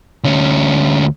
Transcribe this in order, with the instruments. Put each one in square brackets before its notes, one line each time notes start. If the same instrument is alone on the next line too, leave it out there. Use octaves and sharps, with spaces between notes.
[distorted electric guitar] D2 C#4